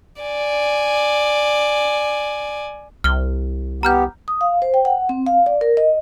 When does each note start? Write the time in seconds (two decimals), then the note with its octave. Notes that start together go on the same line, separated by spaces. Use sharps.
0.22 D5 G#5
3.04 C2 F6 G7
3.83 B3 G4 A#5 F6 G6
4.28 D#6
4.41 F5
4.62 C5
4.74 G5
4.85 F#5
5.09 C4
5.27 F5
5.46 D5
5.61 A#4
5.77 D#5